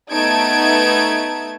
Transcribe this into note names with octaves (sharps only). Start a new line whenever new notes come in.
A3 B3 D#4 A5 G#6 D7